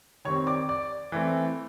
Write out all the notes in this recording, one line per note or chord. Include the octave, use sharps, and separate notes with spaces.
D#3 G3 C4 C#5 C#6
D5 D6
D5 D6
E3 A3 C4